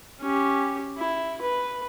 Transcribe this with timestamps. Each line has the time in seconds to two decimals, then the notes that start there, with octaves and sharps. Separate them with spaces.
0.21 C#4 G4
0.99 E4
1.42 B4